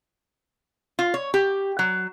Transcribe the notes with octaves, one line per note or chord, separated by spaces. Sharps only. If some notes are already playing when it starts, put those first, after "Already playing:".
F4
C#5
G4
F#3